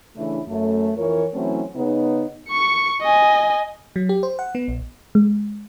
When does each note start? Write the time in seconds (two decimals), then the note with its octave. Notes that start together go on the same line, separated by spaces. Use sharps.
0.16 C#3 E3 A3 D4 E4
0.48 F#2 A3
0.97 F2 E3 F4 A#4 C#5
1.33 E3 F#3 A3 C4 C#4 E4
1.76 C#3 B3 D#4
2.49 C#6 C#7
3.01 D#5 G#5
3.96 F#3
4.09 G4
4.23 C5
4.39 F#5
4.55 B3
4.68 A#1
5.15 G#3